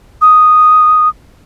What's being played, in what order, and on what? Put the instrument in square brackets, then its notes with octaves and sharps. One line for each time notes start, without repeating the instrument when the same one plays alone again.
[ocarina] D#6